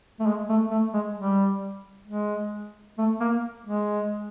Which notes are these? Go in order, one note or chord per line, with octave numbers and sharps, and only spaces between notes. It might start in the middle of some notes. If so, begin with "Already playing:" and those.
A3
G#3
A3
A3
G#3
G3
G#3
A3
A#3
G#3